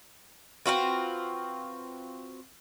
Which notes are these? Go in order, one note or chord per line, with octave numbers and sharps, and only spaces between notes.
C4 F4 F#4 B4